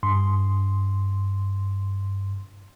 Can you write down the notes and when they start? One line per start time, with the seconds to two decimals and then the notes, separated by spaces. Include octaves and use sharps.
0.03 G2 C6